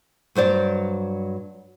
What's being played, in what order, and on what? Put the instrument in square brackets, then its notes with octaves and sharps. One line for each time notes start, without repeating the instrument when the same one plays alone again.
[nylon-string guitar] G2 F#3 C5 D5